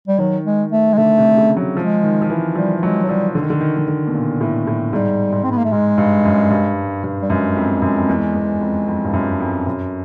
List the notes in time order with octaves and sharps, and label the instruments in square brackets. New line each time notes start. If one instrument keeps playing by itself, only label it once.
[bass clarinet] G3
[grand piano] D#3 [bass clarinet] F#3
[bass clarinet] G#3
A3
G#3
[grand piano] D3 [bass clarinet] A3
[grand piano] C3
C#3
F#3
[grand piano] F3 [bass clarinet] G#3
[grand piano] D#3
F3
E3
[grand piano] F3 [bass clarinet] G3
[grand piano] F#3 [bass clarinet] G#3
[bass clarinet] F#3
[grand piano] F3 [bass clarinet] G3
[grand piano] D3
D#3
D3
D#3
D#3
D3
B2
A#2
A2
A2
[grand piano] G#2 [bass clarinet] G3
[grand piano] G#2
[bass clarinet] C4
B3
A#3
A3
[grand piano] G#2 [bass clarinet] G#3
[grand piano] G2
F#2
G2
G2
[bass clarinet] G3
[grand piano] F#2 [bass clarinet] G#3
[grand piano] F2
F#2
F2
E2
E2
F2
F2
G2
F#2
F2
F#2